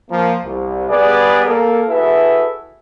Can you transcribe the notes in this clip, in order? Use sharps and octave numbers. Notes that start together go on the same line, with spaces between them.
F3 A#3
C2
G3 B3 G#4 B4 D5
A#3 A4 A#4
E4 F#4 G#4 A4 B4 E5